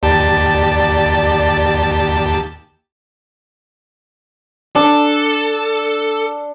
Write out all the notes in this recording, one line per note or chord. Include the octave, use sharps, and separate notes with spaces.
D#2 G4 D5 A5
D4 A4